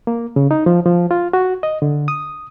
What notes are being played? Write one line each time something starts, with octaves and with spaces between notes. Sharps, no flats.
A#3
C#3
D#4
F3
F3
F4
F#4
D#5
D3
D#6